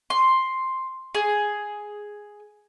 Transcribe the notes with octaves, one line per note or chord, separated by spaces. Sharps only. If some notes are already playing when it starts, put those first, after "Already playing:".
C6
G#4